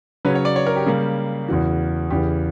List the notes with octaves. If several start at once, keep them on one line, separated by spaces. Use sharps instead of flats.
C#3 F#3 C#4 B4
C#5
D5
C#5
A#4
G4
C#3 G3 A#3
E2 C#3 E3 F#4
E2 C#3 E3 G4